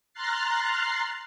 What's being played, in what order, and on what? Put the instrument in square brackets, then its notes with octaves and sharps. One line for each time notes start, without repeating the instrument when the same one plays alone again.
[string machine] A#5 C6 F6 F#6 A6 C7